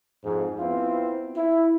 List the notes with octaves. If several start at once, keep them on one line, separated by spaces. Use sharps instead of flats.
F2 G#2
B3 C4 E4 F4
E4